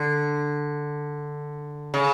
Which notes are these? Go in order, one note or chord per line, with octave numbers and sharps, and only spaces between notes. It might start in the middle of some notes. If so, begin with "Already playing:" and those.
Already playing: D3
C#3